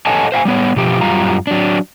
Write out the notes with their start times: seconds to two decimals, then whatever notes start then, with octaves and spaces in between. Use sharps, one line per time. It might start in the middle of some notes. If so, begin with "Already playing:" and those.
0.06 A4 C#5 D#5 F#5 G#5 A5
0.32 C5 F5 F#5 G#5
0.45 G3 B3 C#5
0.76 B2 F3 G4
1.01 F#2 G3 F4 F5 A#5
1.47 F#3 D4